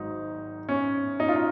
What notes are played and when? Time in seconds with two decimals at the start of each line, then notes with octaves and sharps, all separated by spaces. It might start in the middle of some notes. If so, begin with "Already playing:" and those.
Already playing: G#1 G#2 F#3 D#4
0.69 C#4
1.20 D#4
1.28 F4
1.36 D#4